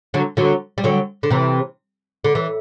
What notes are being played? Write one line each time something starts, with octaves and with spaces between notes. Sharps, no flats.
D3 F#3
D3 F#3
G3
D3 F#3
D3
C3 E3
D3
E3